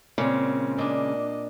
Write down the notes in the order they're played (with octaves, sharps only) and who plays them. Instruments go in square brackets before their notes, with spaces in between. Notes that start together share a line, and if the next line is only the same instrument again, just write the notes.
[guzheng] A#2 [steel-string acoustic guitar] C#3 G#3 [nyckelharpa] C4
[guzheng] A#2 D4 [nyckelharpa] D#5